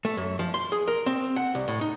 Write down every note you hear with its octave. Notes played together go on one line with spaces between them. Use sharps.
A3
F#2
F3
C6
G#4
A#4
C4
F#5
C2
A2
D#4